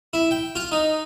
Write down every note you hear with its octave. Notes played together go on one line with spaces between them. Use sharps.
E4
G5
F4
D#4